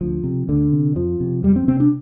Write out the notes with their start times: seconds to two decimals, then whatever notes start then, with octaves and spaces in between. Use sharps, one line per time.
0.01 D2 F3
0.24 C3
0.49 D2 D3
0.73 C3
0.95 F2 F3
1.20 C3
1.43 F2 G3
1.56 C4
1.68 C3 C4
1.80 D4